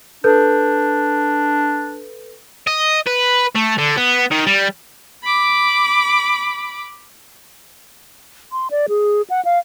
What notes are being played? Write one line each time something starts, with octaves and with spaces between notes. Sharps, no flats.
D4 A4 B4 G6
D#5
B4
A3
D3
B3
D#3
G3
B5 D6
C6
D5
G#4
F#5
F5